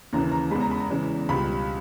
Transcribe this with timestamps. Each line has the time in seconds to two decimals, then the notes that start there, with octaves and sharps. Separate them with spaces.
0.13 D#2 C#3 E3 A#5
0.32 A#5
0.51 E2 C#3 G#3 B5
0.61 A#5
0.71 B5
0.80 A#5
0.90 E2 C#3 E3 G#3
1.29 C#2 B2 G3 B5